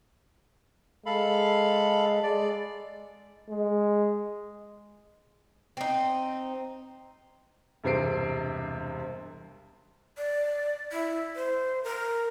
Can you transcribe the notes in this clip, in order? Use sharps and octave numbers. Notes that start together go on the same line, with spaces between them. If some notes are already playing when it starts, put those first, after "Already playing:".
G#3 A4 F5 B5
G#3 D5
G#3
C4 D#4
E1 G2 C3 C4 C7 D7
D5
E4
C5
A#4